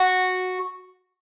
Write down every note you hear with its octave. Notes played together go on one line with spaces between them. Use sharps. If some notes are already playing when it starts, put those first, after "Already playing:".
Already playing: F#4